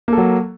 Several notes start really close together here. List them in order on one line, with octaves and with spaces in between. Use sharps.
A#3 A4 F#3